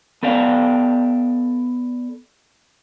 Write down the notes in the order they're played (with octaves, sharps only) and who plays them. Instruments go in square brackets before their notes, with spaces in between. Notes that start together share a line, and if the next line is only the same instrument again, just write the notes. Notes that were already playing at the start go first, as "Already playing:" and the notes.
[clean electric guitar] B3 A4 D5 F5